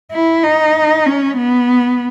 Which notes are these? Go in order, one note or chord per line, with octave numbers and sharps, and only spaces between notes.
E4
D#4
C#4
B3